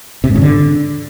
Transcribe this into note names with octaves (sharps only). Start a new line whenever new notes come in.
C3
G#2
C#3
D3